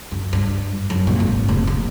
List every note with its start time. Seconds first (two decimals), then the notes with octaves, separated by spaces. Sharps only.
0.12 F#2
0.33 G2
0.90 F#2
1.07 A#2
1.20 G#1
1.49 F1
1.67 A#1